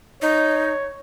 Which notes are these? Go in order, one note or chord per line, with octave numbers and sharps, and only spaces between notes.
D#4 C#5